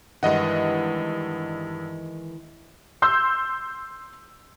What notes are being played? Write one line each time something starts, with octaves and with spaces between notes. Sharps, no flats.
G2 D#3 E3 G#3 D#5 F#5
C6 E6 G6